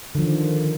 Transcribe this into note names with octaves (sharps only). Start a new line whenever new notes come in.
D3 D#3 F3